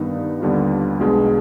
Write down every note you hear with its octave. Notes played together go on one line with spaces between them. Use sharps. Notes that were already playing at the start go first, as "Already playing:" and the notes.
Already playing: G2 D#3 B3 D#4
D#2 D3 G3 B3 F4
B1 B2 G#3 D4 G#4